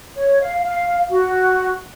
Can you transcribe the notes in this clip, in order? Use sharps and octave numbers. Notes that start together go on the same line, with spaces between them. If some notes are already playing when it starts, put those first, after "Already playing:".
C#5
F5
F5
F#4